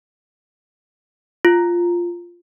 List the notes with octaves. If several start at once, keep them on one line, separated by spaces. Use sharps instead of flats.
F4